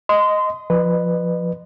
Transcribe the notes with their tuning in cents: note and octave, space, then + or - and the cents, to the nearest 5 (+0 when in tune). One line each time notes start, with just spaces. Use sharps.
D#5 +0 C6 -25
F3 +0 B4 +0 D#5 -40